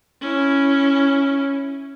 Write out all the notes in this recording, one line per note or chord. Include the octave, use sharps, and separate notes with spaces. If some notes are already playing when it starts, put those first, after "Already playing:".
C#4 E4